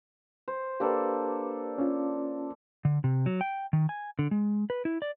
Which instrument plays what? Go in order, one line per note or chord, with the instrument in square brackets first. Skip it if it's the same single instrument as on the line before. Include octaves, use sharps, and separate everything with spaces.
[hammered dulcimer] C5
[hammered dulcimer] A#3 D4 A4 [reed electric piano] G4 B4
[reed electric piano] C#4 F4
[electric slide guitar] D3
C3
F#3
G5
D#3
G#5
D3
G#3
B4
E4
D5